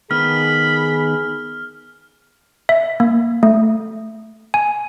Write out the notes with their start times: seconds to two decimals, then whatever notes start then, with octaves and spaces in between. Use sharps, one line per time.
0.11 D#3 B3 G#4 B5 F6
2.69 E5
3.00 A#3
3.43 A3
4.54 G#5